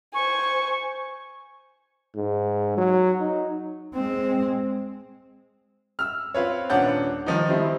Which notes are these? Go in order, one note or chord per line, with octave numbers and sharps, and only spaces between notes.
C5 G#5 C#6
G#2
F#3
D#4
G#3 C4
E6 F6
C4 F4 B4 C#5
D#1 C#4 D4 F#5 G6
D#3 F3 D#4
D#3 G3 C4 E4